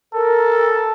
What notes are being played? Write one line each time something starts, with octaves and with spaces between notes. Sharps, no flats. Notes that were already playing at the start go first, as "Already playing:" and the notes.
A4 A#4